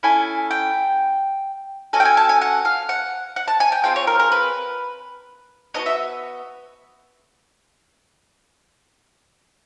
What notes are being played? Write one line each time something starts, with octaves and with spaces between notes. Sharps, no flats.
C#4 E4 A4 G#5
G5
C#4 F#4 A4 G#5
G5
G#5
A5
G#5
F#5
F5
F#5
F#5
A5
G#5
G5
C4 F4 G#4 G5
C#5
A#4
A#4
B4
B3 D4 F#4 D#5
E5